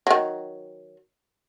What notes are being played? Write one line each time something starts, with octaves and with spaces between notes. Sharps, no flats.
D#3 F#3